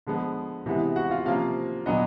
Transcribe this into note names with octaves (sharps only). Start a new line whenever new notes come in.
D3 F3 G#3 B3
C3 E3 G#3 B3
F#4 F#5
F4 F5
C3 F3 A#3 C#4 F4 F5
A#2 F#3 B3 D4 D#5